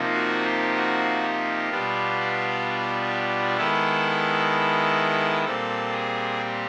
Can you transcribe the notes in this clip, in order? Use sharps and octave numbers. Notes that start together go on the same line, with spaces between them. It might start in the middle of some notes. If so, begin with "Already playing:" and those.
Already playing: C3 F3 A#3 D#4
F#4
G4
F#4
G4
B2 G3 B3 D4 F4
D#3 G#3 B3 E4 A4
A#2 G3 C4 A4
G#4
G4